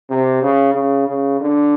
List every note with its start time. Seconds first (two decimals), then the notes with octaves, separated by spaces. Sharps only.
0.10 C3
0.43 C#3
0.75 C#3
1.08 C#3
1.41 D3